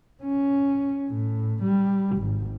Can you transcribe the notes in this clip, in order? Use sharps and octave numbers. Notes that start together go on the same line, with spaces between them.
C#4
A2
G3
G#1